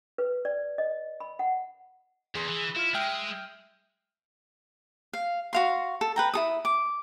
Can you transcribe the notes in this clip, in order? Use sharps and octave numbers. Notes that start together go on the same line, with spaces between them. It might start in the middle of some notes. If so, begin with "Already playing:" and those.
B4
D5
D#5
B5
F#5
E2 G#4 C6
E3
E4 F4 F6
G#3 E5 G5 F6
F5
F#4 F5 C6
A4
B4 G5 A#5
E4 A4 D#6
D6